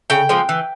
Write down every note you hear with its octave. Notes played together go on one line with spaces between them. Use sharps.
C#3 G5
F3 G#3 C4
E3